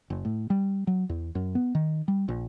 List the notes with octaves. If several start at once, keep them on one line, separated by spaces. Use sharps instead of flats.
F#1
A2
G3
F#3
E2
F#2
B3
D#3
G3
A#1